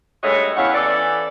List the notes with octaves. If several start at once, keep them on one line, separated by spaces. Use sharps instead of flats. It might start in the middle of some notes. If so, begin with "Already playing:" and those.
G2 G#3 A3 F#4 C#5 D#5
E2 C#4 E4 C#5 F5 F#5
E3 C#4 A4 D5